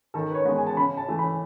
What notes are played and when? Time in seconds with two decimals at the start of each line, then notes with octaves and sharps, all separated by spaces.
0.14 D#3 A4
0.30 B4
0.34 C#5
0.45 G#3 B3
0.56 G#5
0.67 A5
0.77 C#3 B5
0.97 A5
1.08 E3 A3
1.19 B5